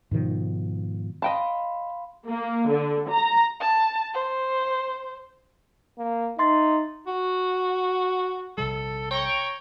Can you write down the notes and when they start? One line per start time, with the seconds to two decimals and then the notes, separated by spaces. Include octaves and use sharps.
0.11 G#2 B2 D#3 F3
1.22 D#5 F5 G5 A5 B5 C6
2.29 A#3
2.72 D3
3.10 A#5
3.60 A5
4.14 C5
5.98 A#3
6.39 D#4 E5 C6 A6
7.07 F#4
8.58 A#1 C3 G3 A4
9.11 C#5 G5 A#5 C#6